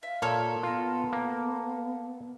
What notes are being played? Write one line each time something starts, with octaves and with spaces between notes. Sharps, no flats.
E5 F5
A#2 A4 A#4 C#5
B3 F4 A#5
A#3